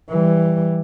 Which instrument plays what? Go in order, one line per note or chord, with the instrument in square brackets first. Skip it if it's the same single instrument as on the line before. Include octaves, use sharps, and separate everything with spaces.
[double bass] E3 G3